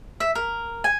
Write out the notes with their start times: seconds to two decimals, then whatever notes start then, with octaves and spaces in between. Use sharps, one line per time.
0.20 E5
0.35 A#4
0.84 G#5